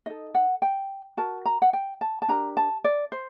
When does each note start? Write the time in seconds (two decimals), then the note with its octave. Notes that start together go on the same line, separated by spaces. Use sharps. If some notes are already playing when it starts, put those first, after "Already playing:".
0.06 D#4 A4 D#5
0.35 F#5
0.62 G5
1.17 F#4 A#4 A5
1.46 A#5
1.62 F#5
1.73 G5
2.01 A5
2.22 A5
2.28 D4 G4 A#4 A#5
2.57 A5
2.84 D5
3.12 C5